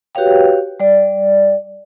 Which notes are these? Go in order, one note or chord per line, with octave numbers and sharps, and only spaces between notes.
F#4 G4 B4 C#5 F5 G5
G3 D5